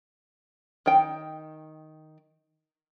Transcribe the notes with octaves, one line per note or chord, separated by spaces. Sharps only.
D#3 G5